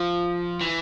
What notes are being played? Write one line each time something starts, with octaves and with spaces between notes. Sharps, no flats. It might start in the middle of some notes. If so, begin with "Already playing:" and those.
Already playing: F3
E3